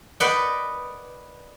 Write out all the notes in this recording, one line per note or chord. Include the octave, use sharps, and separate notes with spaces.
B4 D5 D#5 F#5 G5